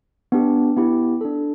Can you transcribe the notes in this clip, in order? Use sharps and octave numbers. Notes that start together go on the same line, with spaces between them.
B3 D4 G4
B3 E4 G4
D4 A4